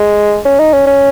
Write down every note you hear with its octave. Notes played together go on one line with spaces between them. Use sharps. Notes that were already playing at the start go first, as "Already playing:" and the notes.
Already playing: G#3
C#4
D#4
C#4
C#4